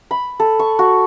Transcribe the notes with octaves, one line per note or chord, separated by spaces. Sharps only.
B5
A4
C#6
F#4